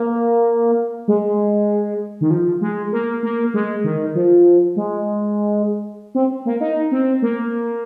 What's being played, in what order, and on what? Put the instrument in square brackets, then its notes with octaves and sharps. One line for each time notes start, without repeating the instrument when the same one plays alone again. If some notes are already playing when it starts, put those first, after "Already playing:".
Already playing: [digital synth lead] A#3
G#3
D#3
F3
G#3
A#3
A#3
G#3
D#3
F3
G#3
C4
A#3
D#4
C4
A#3